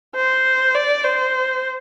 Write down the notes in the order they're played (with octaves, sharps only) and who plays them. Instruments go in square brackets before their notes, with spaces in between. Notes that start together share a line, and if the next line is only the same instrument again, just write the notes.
[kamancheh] C5
D5
C5